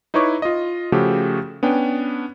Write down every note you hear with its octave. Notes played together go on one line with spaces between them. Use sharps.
D#4 E4 B4 C#5 C#6 D6
F4 D#5
C#3 F3 A3 F#4 G4 A4
B3 C#4 D4 G5